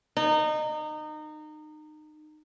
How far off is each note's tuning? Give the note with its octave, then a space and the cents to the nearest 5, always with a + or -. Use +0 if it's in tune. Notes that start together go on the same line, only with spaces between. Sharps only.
D#4 -25